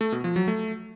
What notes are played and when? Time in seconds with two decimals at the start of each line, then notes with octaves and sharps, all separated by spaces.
0.01 A3
0.12 B2
0.24 F3
0.36 F#3
0.48 A3